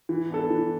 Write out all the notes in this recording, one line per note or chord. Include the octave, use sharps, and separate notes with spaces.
E3
B3 D4 A4
E3